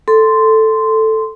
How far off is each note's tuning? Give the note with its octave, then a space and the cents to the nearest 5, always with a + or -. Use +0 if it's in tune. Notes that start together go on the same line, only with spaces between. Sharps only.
A4 +0 C6 -10